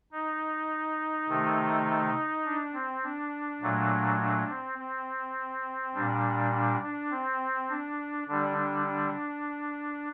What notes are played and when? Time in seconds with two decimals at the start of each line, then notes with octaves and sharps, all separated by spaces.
0.12 D#4
1.28 C3 D#3 A3
2.45 D4
2.74 C4
3.04 D4
3.62 A#2 F#3 A3
4.20 D4
4.49 C4
4.78 C4
5.95 A#2 G3 D4
6.53 D4
6.82 D4
7.11 C4
7.69 D4
8.28 D3 G3 D4
8.57 D4
8.86 D4